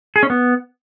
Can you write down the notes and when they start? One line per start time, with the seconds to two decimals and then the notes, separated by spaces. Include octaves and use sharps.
0.16 G#4
0.23 C#4
0.30 B3